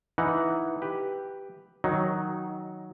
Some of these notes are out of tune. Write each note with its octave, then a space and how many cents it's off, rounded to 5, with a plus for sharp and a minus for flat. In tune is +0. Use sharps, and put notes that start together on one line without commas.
E3 +0 D#4 +0 F#5 +0
G4 +0 B4 +0
D#3 +20 F#3 +0 D#4 +0